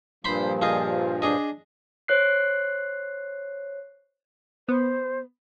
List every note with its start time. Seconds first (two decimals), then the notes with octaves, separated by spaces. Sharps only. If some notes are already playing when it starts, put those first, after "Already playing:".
0.25 G2 A#2 F3 C5 B5 C6
0.62 F4 G#4 D#5
1.22 D4 G#4 D#5
2.08 C5 C#5 F#6 C7
4.69 B3 C5